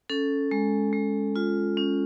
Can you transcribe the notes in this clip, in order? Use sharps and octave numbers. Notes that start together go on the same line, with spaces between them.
C#4 A4
G#3
G#3
F4
C#4